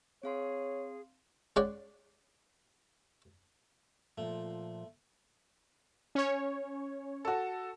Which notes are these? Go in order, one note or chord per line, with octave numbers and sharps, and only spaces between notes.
C4 G#4 C#5 F5 C6
G#3 C#4 C#5 D5 F#5 G5
A#2 F3 A3
C#4 C#5
F#4 A4